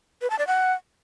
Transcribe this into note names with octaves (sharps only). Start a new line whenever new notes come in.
B4
A5
D5
F#5